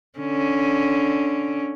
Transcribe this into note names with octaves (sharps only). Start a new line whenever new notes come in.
D3 C#4